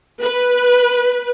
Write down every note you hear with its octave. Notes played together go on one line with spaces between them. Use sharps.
B4